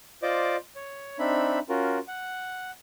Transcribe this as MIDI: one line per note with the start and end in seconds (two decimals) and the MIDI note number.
0.23 0.56 65
0.23 0.56 72
0.23 0.56 74
0.23 0.56 75
0.23 0.56 86
0.76 1.18 73
1.19 1.59 60
1.19 1.59 62
1.19 1.59 63
1.19 1.59 76
1.19 1.59 83
1.69 1.99 61
1.69 1.99 65
1.69 1.99 66
1.69 1.99 70
2.08 2.71 78